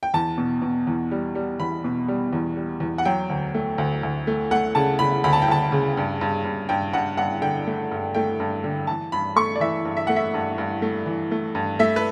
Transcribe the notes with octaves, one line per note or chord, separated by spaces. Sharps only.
G5
E2 A5
B2
B2
E2
G3
G3
E2 B5
B2
G3
E2
G3
E2
F#5
F#3 G5
D2
A3
D2
D2
A3
A3 F#5
C#3 A5
C#3 B5
D2 B5
A5
G5
D2 A5
C#3
G2
G2
G2
G2 G5
G2 F#5
G2 F#5
D3 G5
A3
G2
A3 G5
G2
D3
E3 A5
G2 B5
A3 C#6
D5
E3 E5
G2
E5
A3 F#5
E5
G2
G2
A3
E3
A3
G2
A3 E5
B4